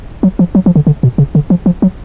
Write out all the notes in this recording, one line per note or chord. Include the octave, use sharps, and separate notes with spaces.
F#3
F3
F#3
F3
D3
D3
B2
C#3
D3
F3
F3
F#3